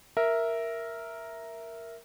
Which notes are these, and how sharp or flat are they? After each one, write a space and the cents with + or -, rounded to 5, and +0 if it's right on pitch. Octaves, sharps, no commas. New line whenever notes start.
A#4 +0 E5 +0